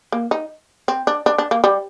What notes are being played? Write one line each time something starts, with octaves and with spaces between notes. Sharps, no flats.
A#3
D#4
C4
D4
D4
D4
A#3
G3